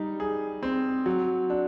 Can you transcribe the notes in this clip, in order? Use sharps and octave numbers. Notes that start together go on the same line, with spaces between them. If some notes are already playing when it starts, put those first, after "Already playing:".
Already playing: G3 D#4
G#4
C4
F#3
D4